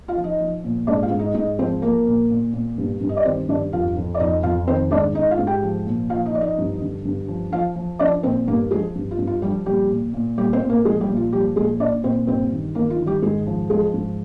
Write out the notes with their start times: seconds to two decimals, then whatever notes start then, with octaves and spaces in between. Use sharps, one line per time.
0.08 F4 F5
0.17 F3
0.24 D#4 D#5
0.40 F3
0.64 A#2
0.87 G#2 D4 D5
1.03 F4 F5
1.11 G#2
1.19 D#4 D#5
1.34 G#2 D#4 D#5
1.59 F3 C4 C5
1.82 F3 A#3 A#4
2.06 A#2
2.30 A#2
2.54 A#2
2.78 G2
3.01 G2
3.09 D#5
3.17 D5
3.25 D#3 C4 C5
3.48 G2 D4 D5
3.72 F2 F4 F5
3.97 F2
4.15 D5
4.20 F2 D#4 D#5
4.43 F2 F4 F5
4.67 D#3 C4 C5
4.91 G#2 D4 D5
5.14 G#2 D#4 D#5
5.31 F4 F5
5.39 G#2
5.47 G4 G5
5.63 F3
5.86 A#2
6.10 F3 F4 F5
6.25 D#4 D#5
6.34 F3 D5
6.41 D#4 D#5
6.58 G2
6.81 D3
7.05 G2
7.28 F3
7.53 F3 F4 F5
7.76 F3
7.99 F3 D4 D5
8.23 A#2 C4 C5
8.47 G2 A#3 A#4
8.71 F3 G#3 G#4
8.95 G2
9.11 F4
9.18 G2
9.27 F4
9.42 F3 G3 G4
9.66 A#2 G3 G4
9.89 A#2
10.13 A#2
10.37 A#2 G3 G4
10.53 C4 C5
10.61 A#2
10.69 A#3 A#4
10.85 F3 G#3 G#4
11.01 G3 G4
11.09 A#2
11.16 F4
11.33 F3 G3 G4
11.56 A#2 G#3 G#4
11.80 A#2 D4 D5
12.03 A#2 C4 C5
12.27 G2 C4 C5
12.52 D#3
12.75 D#3 A#3 A#4
12.90 F4
12.99 D#3
13.06 G3 G4
13.22 G#2 G#3 G#4
13.47 F3
13.70 F3 G#3 G#4
13.93 G#2